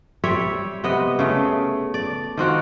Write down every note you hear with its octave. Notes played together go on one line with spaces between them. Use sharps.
G3 C4 C#5 E5
C3 B3 D#5
C#3 A3
D5
D#3 C4 F#4 F5